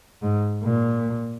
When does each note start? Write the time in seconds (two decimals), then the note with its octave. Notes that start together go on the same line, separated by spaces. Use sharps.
0.22 G#2
0.64 A#2